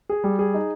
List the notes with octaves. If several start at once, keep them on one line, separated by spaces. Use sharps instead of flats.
G#4
G3
G#4
D#4